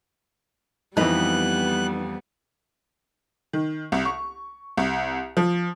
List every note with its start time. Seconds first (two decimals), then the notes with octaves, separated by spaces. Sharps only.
0.97 F2 E3 G3 B3 D#4 B4 F#6
3.53 D#3
3.92 C2
4.05 C#6
4.77 C2
5.37 F3